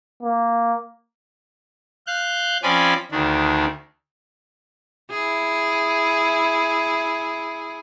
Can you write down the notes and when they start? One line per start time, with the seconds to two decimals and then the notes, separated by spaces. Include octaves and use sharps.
0.23 A#3
2.07 F5 F#6 G6
2.63 F3 C4 C#4 D5 G#5 B5
3.11 D2 D#3 D4
5.11 E4 G#4